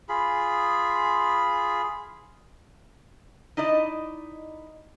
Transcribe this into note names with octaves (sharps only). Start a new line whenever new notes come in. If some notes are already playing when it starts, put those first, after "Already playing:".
F4 G#4 B5
D#4 E4 D5 D#5